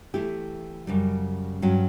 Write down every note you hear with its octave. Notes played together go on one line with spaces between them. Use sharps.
E3 A3 E4 G4
F#2 C#3 G3
G2 F#3 C#4